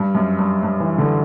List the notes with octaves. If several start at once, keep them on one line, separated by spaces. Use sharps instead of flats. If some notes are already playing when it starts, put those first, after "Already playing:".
Already playing: G2
F#2
G2
G2
E3
D3